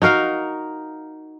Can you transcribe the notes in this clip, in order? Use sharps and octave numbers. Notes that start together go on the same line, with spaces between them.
D#4 F#4 A#4 F5